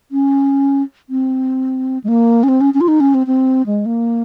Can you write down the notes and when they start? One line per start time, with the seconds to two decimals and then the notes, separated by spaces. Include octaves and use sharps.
0.12 C#4
1.10 C4
2.04 G#3
2.08 A#3
2.43 C#4
2.48 C4
2.61 C#4
2.74 C#4
2.81 F4
2.88 D#4
3.00 C#4
3.14 C4
3.27 C4
3.66 G#3
3.86 A#3